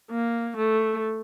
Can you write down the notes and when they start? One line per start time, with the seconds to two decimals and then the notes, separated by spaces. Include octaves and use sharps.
0.11 A#3
0.57 A3